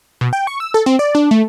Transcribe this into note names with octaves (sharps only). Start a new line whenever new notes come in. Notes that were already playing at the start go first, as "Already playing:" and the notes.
B2
G5
C#6
E6
A4
C4
D5
D4
A3